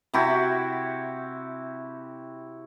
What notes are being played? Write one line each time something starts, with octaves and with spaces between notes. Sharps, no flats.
C3 E4 F#4 G4